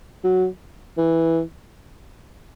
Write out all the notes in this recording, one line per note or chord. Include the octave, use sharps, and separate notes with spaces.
F#3
E3